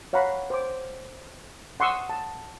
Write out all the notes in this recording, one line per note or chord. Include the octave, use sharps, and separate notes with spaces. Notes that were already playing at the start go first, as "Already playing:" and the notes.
C#5 F5 F#5 A#5 B5
C5 D6
F#5 C6 C#6 D#6 E6
A5